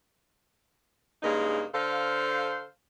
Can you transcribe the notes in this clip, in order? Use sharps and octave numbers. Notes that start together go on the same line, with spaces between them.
G2 C#3 G#3 A#3 D#4
D3 A4 C5 F5